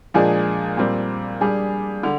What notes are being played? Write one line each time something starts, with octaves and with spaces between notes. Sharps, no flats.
A#2 F3 G#3 D4 G#4
A#2 G3 C4
G3 D4 G#4
D3